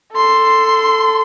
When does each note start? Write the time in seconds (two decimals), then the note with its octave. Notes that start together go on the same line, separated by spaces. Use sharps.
0.13 A4 C6